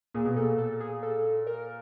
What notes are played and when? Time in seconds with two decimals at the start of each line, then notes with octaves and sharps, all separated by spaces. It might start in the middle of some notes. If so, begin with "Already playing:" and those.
0.14 A#2 G#4
0.25 B2
0.36 A#2 A4
0.58 A4
0.80 G#4
1.03 A4
1.47 A#4